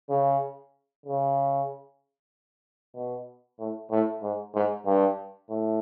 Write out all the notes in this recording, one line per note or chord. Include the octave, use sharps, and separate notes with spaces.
C#3
C#3
B2
A2
A2
G#2
G#2
G2
A2